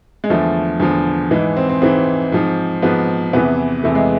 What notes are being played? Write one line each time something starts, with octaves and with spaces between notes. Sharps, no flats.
G#3
E2 D3 F3 A3
E2 D3 F3
G#2 E3 G#3
C4
C4
G#2 E3 C4
G#2 F3
G#2 F3 B3
E2 C3 E3 B3
E2 C3 E3 A3
G#3